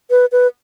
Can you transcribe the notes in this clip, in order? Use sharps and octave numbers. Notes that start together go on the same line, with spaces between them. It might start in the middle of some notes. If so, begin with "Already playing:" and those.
B4
B4